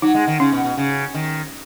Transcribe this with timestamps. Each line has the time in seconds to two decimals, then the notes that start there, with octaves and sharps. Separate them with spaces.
0.02 F#3 D#4
0.14 G#3
0.27 D#3
0.40 C#3 C#4
0.52 B2
0.64 B2
0.77 C#3
1.14 D#3